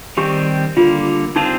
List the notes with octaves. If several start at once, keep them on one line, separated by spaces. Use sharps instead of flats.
D#3 G3 C4 G4
D3 G3 A#3 F4
G3 C4 D#4 F4 G#4 C5